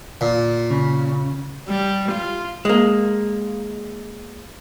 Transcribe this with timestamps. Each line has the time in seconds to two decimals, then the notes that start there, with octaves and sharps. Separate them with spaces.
0.21 A#2
0.71 C#3
1.68 G3
2.11 F4
2.65 G#3 A#3